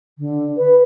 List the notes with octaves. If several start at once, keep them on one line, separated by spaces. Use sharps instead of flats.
D3
B4